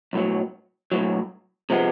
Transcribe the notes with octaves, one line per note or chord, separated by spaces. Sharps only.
B1 A2 F#3
B1 A2 F#3
C3 F3 G#3 B3